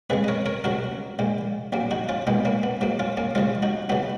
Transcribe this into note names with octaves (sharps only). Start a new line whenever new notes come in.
F2 C#3 G#3 G#4 B4
D#5
A#4 C#5
A#4 C#5
C#2 B2 F#3 F#4 A#4
A#1 A#2 G#3
A#1 A#2 F#3 A#3
D#4 F#4
C#4 F4
B1 A#2 G#3 B3 D#4
A#3 C#4
B3
G#2 F#3 A#3
C#4 F4
A#3 C#4
D#2 C#3 F3 G#3 C#4 F4
D#4 F#4
C#3 F#3 B3 D#4